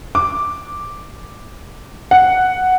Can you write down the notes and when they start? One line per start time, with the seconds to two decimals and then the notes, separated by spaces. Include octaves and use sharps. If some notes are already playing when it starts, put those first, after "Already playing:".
0.15 D6
2.11 F#5